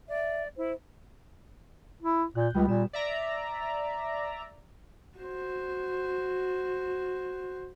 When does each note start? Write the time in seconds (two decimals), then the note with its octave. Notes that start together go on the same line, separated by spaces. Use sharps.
0.08 D5 E5
0.57 E4 C5
2.02 E4
2.35 A#2 F#6 G6
2.54 C#2 G3 B3
2.69 A#2 E7
2.93 D5 E5 A#5
5.18 F#4 C5